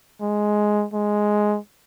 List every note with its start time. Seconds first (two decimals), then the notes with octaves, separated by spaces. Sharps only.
0.21 G#3
0.93 G#3